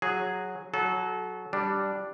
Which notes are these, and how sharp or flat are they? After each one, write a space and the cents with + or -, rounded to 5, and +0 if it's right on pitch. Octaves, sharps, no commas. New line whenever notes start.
F#3 -5 G#4 +0
F#3 +0 A4 -30
G3 +0 D4 +0